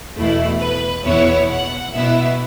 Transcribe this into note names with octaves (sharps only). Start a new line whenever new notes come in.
E2 B2 A3 E4
B4
E2 B2 B3 E4 C#5
F#5
B2 B3 E4 E5